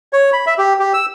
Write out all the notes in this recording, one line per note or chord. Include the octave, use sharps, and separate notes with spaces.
C#5
B5
E5
G4
G4
E6